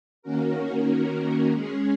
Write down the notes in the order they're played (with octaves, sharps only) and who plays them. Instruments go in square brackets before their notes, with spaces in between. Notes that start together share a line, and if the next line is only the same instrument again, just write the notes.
[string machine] D#3 A#3 C#4 F#4 A#4
G#3 C#4 G#4